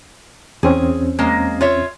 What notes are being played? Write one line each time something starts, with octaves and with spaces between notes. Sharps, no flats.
E2 C4 C#4 G#4
G#3 A#3
F4 C#5 E5